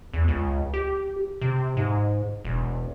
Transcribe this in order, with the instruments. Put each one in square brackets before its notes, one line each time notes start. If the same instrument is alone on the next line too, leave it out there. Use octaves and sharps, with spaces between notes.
[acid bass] E2
C#2
G4
C3
G#2
E1